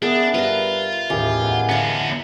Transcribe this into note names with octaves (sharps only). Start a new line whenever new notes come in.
B3 D4 G#4 A#4 E5
G2 F4 B4 A#5
A1 D#2 A2 C#3 A3 G4 G#5
E2 F#5
D3 B3 F5 A5 A#5